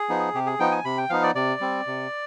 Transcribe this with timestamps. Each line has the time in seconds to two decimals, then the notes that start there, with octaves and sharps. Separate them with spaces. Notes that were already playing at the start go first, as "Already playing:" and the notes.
Already playing: G#4
0.09 F3 B3 D#4
0.34 C3 G4
0.46 G#4
0.60 F3 B3 D#4 G5
0.72 G#5
0.85 C3 B5
0.98 G5
1.10 F3 B3 D#4 F5
1.23 D5
1.35 C3 D5
1.60 G3 C4
1.87 C3